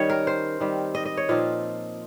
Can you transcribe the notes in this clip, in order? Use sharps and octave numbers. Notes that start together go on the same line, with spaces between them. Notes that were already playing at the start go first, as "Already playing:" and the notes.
Already playing: D#3 G3 C#4 C#5
A#4
C5
D#3 G3 C4
D#5
D#5
C#5
A#2 F3 C4 D#4 F4